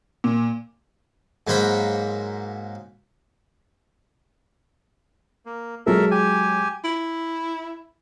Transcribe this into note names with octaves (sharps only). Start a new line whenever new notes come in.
A#2
G#2 F#3 A#3 C5 F#5 B5
A#3
F#3 G#3 A4 A#4 E5
G4 G#5
E4